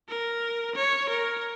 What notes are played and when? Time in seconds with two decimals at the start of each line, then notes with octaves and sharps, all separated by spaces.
0.09 A#4
0.76 C#5
1.10 A#4